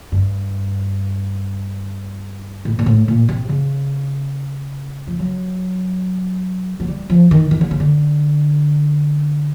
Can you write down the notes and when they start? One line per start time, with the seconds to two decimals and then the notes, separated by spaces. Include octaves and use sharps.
0.12 G2
2.65 A2
2.79 A#2
2.86 A2
3.08 A#2
3.29 C3
3.49 C#3
5.07 F3
5.19 F#3
6.80 F#3
6.88 G3
7.10 F3
7.31 D#3
7.51 D#3
7.61 D3
7.71 C#3
7.80 D3